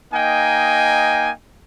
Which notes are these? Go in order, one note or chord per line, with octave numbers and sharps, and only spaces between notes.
A#3 D#4 D#5 G5 G#5